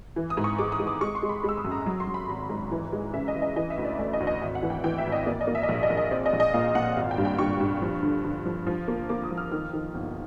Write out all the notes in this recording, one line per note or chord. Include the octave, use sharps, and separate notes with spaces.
E3
D#6
G#2
C#6
G#3 D6
D#6
G#3
D6
G#3 C#6
C6
G#3
B5
G#3
E6
D#6
F#2
A#5
F#3
C6
F#3
B5
G#1 A#5
G#2
E3
G#3
C#3 E5
D#5
C#3
D#5
E3 D#5
E5
D2
D5
A3 D#5
D#5
D2
D#5
G#1 E5
F#5
E3
G5
E3 G5
E5
G#1
D#5
A#3 D5
D#5
A#3
E5
D#5
A#1 E5
D#5
A#1
D#5
C4 D5
D#5
A#1
D#5
A#2 F5
A#2 F#5
G#1 F5
G5
G2
G5
G2 C#6
G2
F3
D3
D3
F3
F3
A#3
A#3 D6
D#6
F3
F6
D#3 F6
D#3
G1